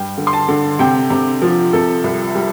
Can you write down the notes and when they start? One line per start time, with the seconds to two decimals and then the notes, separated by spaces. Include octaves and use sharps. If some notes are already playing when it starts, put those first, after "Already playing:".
Already playing: G2 G5
0.18 D3
0.27 C6
0.33 A5
0.48 D3
0.79 C3 G5
1.10 C3
1.42 F3
1.73 C3 A4
2.04 C2
2.35 G3